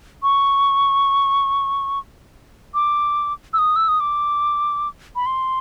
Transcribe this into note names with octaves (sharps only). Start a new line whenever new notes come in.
C#6
D6
E6
D#6
E6
D#6
D6
B5
C6